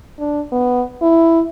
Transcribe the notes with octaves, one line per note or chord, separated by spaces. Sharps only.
D4
B3
E4